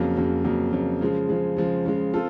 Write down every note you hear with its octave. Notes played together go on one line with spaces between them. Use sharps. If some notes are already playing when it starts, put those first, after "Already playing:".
Already playing: F2 C#3 F#3 A#3
F2 C#3 F#3 A#3
F2 C#3 F#3 A#3
F2 C#3 F#3 A#3
C#3 F3 G#3
C#3 F3 G#3
C#3 F3 G#3
C#3 F3 G#3
C4 F4 A4